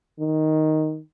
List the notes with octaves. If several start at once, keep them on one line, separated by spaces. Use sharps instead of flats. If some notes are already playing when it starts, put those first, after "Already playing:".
D#3